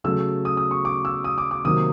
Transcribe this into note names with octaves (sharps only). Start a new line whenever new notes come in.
C#3 F#3 A3 E6
D#6
D#6
C#6
D6
E6
D#6
D6
D6
C3 D#3 F#3 A#3 D#6